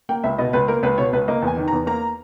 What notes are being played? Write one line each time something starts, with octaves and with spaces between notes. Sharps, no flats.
A#3 G5
C#2 E5
B2 D#5
C#2 B4
A#3 A#4
C#2 B4
B2 C#5
C#2 B4
A#3 D#5
E2
G#5
D#3
A#5
E2
A#3 A#5